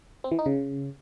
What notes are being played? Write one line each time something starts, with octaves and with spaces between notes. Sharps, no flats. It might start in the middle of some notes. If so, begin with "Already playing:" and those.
C4
E3
D#4
C#3